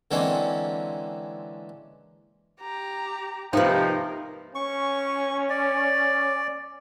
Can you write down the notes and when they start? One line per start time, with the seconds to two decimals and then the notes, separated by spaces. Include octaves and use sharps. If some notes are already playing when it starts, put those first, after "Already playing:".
0.11 D3 E3 G#3 A#3 C4 C#4
2.61 G4 A#5
3.53 C3 F3 A#3 D#4 A#4 B4
4.55 C#4 C#6
5.50 D5